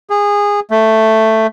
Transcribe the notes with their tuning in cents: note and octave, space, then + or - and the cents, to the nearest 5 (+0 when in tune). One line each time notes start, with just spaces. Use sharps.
G#4 -20
A3 +5